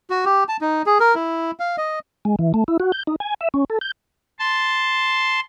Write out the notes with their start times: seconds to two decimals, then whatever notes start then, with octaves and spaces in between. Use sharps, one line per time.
0.10 F#4
0.25 G4
0.48 A5
0.61 D#4
0.86 G#4
1.00 A#4
1.15 E4
1.60 F5
1.77 D#5
2.25 G#3
2.39 E3
2.54 A3
2.68 E4
2.80 F#4
2.92 G6
3.07 D#4
3.20 G#5
3.41 E5
3.54 C#4
3.70 A4
3.81 G6
4.39 A5 C6